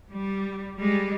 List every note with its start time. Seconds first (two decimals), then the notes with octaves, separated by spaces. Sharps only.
0.11 G3
0.77 G3 G#3